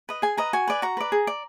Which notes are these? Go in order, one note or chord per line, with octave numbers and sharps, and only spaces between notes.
B4 D#5
G#4 G#5
B4 D#5 A#5
F#4 G#5
B4 D5
F#4 A#5
B4 D5
G#4
D5